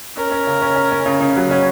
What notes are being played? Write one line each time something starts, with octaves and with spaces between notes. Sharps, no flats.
C#4 A#4
C#4
C#3
C#4
C#4
C#4
C#3
C#3
F#3
C#4